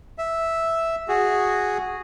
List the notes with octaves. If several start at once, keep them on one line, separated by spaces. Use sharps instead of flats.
E5
F#4 G#4